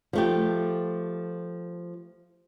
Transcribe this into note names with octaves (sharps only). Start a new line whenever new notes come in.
F3 A3 G4